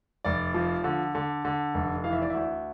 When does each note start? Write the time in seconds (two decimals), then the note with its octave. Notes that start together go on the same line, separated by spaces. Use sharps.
0.25 F1 D5
0.54 F3
0.84 D3
1.15 D3
1.45 D3
1.74 F1
2.04 E3 F5
2.13 E5
2.22 D5
2.30 D2 E5